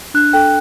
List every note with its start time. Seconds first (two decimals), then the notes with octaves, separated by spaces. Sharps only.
0.14 D4 F#6
0.33 A4 G5